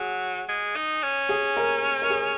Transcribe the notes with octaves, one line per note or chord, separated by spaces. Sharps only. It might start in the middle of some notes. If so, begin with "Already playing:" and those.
Already playing: F#3 G#4
G#3
D#4
C#4
G#4
A#4
A#4
G#4